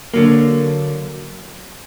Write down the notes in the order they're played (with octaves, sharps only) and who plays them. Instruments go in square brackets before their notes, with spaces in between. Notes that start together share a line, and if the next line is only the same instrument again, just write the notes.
[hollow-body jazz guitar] D3 F#3 A#3